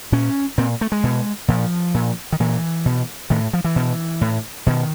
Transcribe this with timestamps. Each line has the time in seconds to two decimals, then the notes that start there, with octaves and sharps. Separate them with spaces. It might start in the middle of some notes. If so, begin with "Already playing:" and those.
0.12 A#2 C#4
0.58 A#2 C4
0.81 A3
0.92 G#3
1.03 B2
1.48 A#2 F3
1.94 A#2
2.32 D#3
2.40 A#2 E3
2.86 B2
3.30 A2 D#3
3.53 F3
3.64 E3
3.76 B2
4.21 A2
4.66 B2 D#3